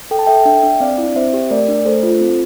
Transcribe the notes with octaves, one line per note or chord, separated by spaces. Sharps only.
A4 G5
A5
A4 E5 G5
D4 E5 G5
D4
C4 D5 F5
E4
C4 C5 E5
G4
A3 A#4 D5
D4
A3 A4 C5
F4
C4